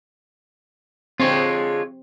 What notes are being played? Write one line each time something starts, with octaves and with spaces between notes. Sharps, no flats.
D3 G#3 C4 F4 C#5